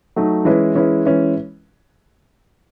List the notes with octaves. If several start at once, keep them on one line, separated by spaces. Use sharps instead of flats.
F#3 A3 D#4
E3 G#3 C#4 E4 B4
E3 G#3 C#4 E4 B4
E3 G#3 C#4 E4 B4